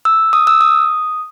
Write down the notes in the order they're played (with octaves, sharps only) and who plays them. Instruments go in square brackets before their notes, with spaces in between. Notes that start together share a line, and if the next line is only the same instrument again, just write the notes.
[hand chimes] E6
D#6
E6
D#6